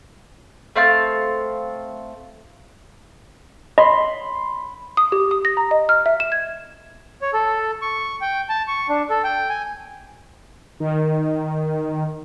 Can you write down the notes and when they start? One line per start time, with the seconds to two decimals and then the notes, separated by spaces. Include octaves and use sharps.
0.76 A3 C4 F5 A5
3.78 D#5 B5 C6
4.97 D#6
5.12 G4
5.31 D#6
5.45 A#6
5.57 A#5
5.71 D#5
5.89 F6
6.06 E5
6.20 E7
6.32 G#6
7.22 C#5
7.33 A4
7.82 C#6
8.21 G5
8.49 A5
8.68 C#6
8.89 D4
9.10 A4
9.24 G5
9.49 G#5
10.80 D#3